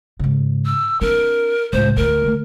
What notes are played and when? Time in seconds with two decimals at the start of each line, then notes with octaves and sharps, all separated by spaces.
0.19 G#2 C#3
0.66 E6
1.01 C4 D4 A#4
1.73 C#2 A2 C5
1.96 D2 F4 A#4
2.23 D3 A3